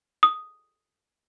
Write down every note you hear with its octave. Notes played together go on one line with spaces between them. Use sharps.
D#6